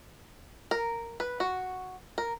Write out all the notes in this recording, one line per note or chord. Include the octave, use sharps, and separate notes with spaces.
A#4
B4
F#4
A#4